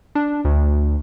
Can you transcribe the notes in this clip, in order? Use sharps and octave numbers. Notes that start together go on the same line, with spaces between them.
D4
D2